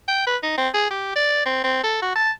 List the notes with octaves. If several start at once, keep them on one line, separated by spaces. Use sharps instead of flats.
G5
B4
D#4
C4
G#4
G4
D5
C4
C4
A4
F#4
A5